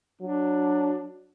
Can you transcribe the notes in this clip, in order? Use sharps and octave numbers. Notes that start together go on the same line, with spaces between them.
F#3 D4